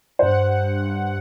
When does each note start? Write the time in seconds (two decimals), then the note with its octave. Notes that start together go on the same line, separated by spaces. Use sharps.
0.19 G2 C5 F#5